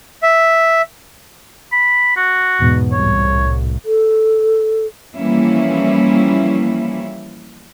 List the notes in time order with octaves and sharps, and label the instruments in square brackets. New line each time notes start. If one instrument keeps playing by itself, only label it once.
[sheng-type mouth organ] E5
[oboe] B5
F#4
[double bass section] E2 G#2 B2
[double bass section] C2 A2 [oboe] C#5
[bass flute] A4
[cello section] E3 F3 G3 A#3 C#4 E4